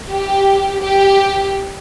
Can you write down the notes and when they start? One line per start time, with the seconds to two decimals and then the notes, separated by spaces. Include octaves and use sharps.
0.11 G4
0.82 G4